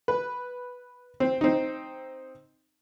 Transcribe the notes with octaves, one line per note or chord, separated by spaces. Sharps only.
B4
C4
C4 D#4